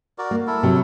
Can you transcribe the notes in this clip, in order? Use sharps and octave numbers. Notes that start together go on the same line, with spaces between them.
F#4 A#4 D5
A#3
E4 A4 A#4
C3 F#3